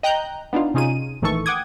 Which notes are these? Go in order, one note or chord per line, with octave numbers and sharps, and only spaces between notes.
D#5 G5 A#5 F#6 G6
B3 D4 D#4 F4
C3 C#4 D#4 F4 G#4 D#7
A#1 A2 D#3 E3 A4 C#6
F#5 G5 D6 D#6 G#6